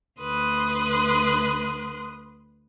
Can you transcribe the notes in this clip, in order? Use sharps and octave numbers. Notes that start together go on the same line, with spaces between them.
D2 B4 C6 D#6